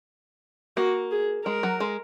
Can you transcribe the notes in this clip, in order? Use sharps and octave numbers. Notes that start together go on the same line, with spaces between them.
A#3 F#4
G#4
G#3 A#4
F#3
G#3